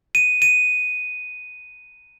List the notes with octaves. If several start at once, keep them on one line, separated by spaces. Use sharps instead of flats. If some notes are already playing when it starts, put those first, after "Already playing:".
D#7
D#7